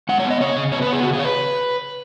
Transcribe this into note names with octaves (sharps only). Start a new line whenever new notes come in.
G#3 F#5
C#5
B3
D#5
C#3 C#5
C#3
B3 C#5
B4
B3
G#4
C#3 F#4
G#4
C#5
B4